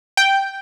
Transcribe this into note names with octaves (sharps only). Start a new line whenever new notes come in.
G5